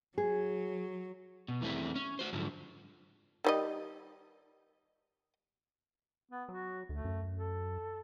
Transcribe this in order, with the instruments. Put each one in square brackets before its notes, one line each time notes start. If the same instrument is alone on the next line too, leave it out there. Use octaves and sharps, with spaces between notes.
[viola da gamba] F#3 [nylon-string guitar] G#4
[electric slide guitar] B2
E2 E3 A3 C4 E4
C#4
F#4 C5
G#2 D3 F3 F#3
[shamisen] D#3 G3 D#5
[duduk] B3
[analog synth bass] F#3 [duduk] F#4
[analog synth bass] D2 [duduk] A3
[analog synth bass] F#2
[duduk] A4